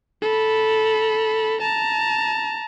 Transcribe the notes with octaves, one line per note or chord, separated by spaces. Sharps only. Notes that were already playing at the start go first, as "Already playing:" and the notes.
A4 B5
A5 A#5